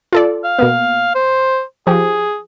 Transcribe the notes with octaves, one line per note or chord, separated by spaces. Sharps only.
F4 A4 D5
F5
B2 A#3 B3
C5
F3 G4 G#4